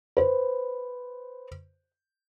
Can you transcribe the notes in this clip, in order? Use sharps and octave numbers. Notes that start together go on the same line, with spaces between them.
B4 C5